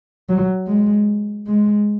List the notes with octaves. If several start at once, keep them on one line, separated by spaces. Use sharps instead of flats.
F#3
G#3
G#3